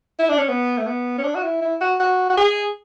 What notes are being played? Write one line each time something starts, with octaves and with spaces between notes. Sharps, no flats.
E4
D4
C#4
B3
A3
B3
C#4
D4
F#4
E4
E4
F#4
F#4
F#4
G#4